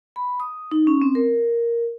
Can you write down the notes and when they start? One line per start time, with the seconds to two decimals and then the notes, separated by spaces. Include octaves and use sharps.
0.16 B5
0.40 D#6
0.71 D#4
0.87 C#4
1.02 C4
1.15 A#4